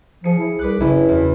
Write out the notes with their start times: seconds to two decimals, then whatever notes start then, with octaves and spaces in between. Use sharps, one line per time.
0.24 F3 G#4 C#7
0.39 E4
0.59 C2 B4 D6 F#6
0.80 F#1 C#4 E4
1.09 E2